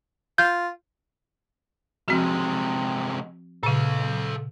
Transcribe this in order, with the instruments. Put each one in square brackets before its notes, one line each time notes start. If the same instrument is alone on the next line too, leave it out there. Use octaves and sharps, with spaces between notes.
[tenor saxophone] F4 [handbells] G6
[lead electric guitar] C3 G#3 [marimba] F3 C4 F#4
[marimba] A#2 C#3 [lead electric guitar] A4 F5